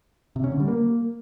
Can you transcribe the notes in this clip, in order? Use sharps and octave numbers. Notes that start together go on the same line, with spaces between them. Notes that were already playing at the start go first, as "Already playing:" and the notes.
C3
C#4
D3
G3
A#3